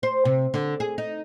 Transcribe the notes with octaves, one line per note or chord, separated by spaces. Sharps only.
C5
C3
D3
G#4
D#4